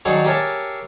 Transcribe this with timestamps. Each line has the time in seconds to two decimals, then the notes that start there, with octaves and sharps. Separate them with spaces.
0.05 D#3 F#3 D4 D#4 G#4 C#5
0.25 G4 G#4 A#4 C#5 E5 A5